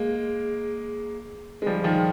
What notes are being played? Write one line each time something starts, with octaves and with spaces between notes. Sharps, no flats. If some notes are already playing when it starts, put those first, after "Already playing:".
Already playing: G#3 A#3
G#3
F3 G3
D#3 F3